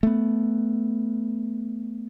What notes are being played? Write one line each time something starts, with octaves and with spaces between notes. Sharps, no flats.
A3 B3